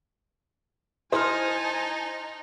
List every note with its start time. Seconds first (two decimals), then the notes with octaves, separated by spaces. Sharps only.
1.12 D#4 E4 C5 G#5 A5 C6 D#6 F6